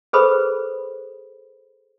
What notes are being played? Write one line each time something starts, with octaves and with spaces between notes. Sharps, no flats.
G#4 A4 B4 C5 B5 D#6